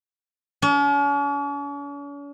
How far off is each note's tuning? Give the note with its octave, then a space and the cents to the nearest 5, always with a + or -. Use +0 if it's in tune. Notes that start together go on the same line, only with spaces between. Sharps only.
C#4 +45